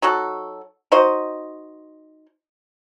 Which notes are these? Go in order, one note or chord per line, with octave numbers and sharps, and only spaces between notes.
F#3 D#4 F#4 A4
D#4 F#4 C5 D#5